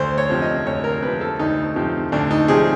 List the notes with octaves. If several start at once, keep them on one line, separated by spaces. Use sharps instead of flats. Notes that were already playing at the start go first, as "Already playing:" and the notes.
Already playing: D2 C5
C#5
C3 F3
D#5
D2 C#5
A#4
C3 F3 B4
A4
D2 D#4
C3 F3
D2 D4
D#4
C3 F3 G#4